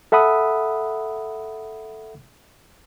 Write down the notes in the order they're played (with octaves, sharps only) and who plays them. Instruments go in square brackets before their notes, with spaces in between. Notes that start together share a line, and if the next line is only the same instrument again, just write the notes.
[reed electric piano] A4 E5 F#5 B5 D#6